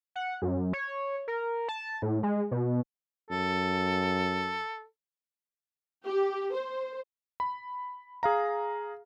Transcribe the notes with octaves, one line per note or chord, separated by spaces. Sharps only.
F#5
F#2
C#5
A#4
A5
A2
G#3
B2
F#2 A4
G4
C5
B5
G#4 F5 A#5